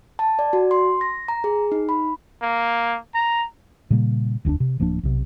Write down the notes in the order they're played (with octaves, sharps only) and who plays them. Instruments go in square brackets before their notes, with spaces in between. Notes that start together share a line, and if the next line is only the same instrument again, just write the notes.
[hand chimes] A5
D5
F#4
C6
A#6
A#5
G#4
D#4
B5
[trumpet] A#3
A#5
[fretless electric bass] A#2 C#3 G3 A#3
E1 D2 C#4 D4
C3
D1 F3 A#3 D4
B1 C3